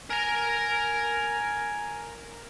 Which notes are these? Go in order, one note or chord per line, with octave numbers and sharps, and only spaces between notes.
A#4 G#5 A#5